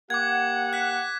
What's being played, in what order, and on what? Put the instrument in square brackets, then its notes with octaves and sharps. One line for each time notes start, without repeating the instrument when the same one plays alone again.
[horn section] A#3 G4 F#5 [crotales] D6 G#6
[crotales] F#6 B6